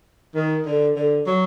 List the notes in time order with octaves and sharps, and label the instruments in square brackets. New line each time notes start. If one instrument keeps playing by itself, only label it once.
[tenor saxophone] D#3
D3
D3
F#3